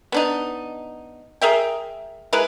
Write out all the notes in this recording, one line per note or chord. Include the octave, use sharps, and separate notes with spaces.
B3 D4 D#4
G#4 A#4 E5 G5
G#3 E4 A#4 B4